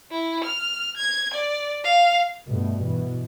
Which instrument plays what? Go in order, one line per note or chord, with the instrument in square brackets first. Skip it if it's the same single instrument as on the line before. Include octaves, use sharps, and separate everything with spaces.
[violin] E4
F6
G#6
D5
F5
[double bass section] G2 B2 A3
B2 E3